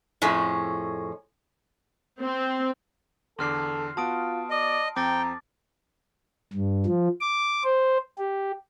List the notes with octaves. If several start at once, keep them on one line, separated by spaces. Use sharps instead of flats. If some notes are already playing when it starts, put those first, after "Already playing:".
F2 A2 G#3 C#4
C4
E2 D3 A4 C6 D6 F6 C7
B3 F4 F#4 A5 D#6 D7
D5 D#5
F2 C4 G5 A#5 D6 A6
G2
F3
D6
C5
G4